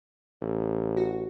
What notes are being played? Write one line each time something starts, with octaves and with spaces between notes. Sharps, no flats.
A1
F#4